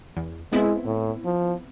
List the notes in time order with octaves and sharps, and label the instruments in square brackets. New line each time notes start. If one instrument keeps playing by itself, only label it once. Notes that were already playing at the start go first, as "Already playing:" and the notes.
[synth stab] E2
[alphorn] G#3 [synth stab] B3 C4 E4
[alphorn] A2
F3